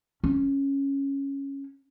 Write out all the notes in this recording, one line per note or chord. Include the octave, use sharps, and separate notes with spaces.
C#4